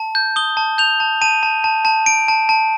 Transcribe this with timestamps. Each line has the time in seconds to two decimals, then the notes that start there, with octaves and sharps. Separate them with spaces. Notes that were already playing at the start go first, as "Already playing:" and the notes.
Already playing: A5
0.15 G6
0.36 D#6 G7
0.57 A5
0.78 G6 F7
1.00 A5
1.21 A5 D#7
1.43 A5
1.64 A5
1.85 A5
2.06 A5 D7
2.28 A5
2.49 A5